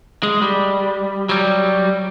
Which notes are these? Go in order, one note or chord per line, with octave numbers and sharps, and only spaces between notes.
G#3
G3
F#3 G3